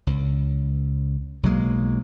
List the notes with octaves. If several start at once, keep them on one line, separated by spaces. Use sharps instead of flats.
C#2
B1 F#3 G#3 A#3